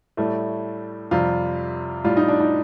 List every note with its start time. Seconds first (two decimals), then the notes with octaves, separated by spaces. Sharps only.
0.17 A2 G3 A3
1.11 F2 C3 G3 F4
2.04 A2 G3 F4
2.17 D#4
2.28 D4
2.40 D#4